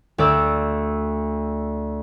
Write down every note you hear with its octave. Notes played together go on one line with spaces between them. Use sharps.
D2 D5 E6